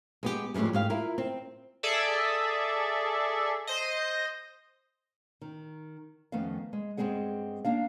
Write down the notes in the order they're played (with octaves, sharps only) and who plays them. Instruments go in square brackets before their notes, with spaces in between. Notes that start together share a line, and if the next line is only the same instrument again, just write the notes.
[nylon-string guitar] G#3 B3 G4
F2 A2 C#3 G3 G#3
G#2 G4 F5
E4 F4 A#4
C4
[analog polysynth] G#4 A4 D5 E5
C5 D#5
[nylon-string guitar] D#3
F2 D#3 A3 B3 C#4 F5
G#3
G2 F3 G#3 C4 G#4 F#5
A#3 D4 F5